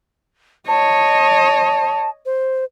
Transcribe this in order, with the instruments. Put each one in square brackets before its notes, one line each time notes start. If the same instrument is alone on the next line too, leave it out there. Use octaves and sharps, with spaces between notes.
[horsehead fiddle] C#5 D#5 [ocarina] A5
[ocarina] C5